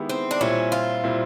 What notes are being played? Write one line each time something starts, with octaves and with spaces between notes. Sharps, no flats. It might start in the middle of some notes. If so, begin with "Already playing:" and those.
Already playing: D#3 G#3 B3 E4 G4
C4
D4
A#2 G3 C4 C#4 E4
F4
A#2 G3 C4 E4